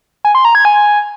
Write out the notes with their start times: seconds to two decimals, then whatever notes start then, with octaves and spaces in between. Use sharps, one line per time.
0.25 G#5
0.35 C6
0.45 A#5
0.55 G#6
0.65 G#5